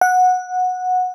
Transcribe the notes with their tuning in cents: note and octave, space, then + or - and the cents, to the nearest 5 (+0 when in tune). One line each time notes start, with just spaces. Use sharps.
F#5 -15